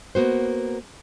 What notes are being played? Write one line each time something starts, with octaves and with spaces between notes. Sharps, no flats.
A#3 B3 F#4 C5